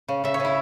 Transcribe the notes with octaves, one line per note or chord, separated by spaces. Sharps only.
C#3
C#3 E5
C#5
C#3 E4